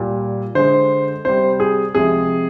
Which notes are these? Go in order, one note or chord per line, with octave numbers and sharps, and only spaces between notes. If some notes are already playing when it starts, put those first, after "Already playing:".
Already playing: A#2 G3
D3 G#3 C5
C3 G3 C5
G#4
C3 F3 G#3 G#4